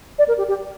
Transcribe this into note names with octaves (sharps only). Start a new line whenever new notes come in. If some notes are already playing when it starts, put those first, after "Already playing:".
D5
A#4
G4
G4